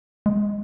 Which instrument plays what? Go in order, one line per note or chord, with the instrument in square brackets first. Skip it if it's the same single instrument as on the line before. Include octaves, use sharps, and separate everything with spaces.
[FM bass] G#3